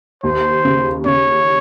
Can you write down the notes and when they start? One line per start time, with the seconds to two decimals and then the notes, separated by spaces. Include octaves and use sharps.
0.23 D#2 C5
0.65 C#3
1.05 C#3 C#5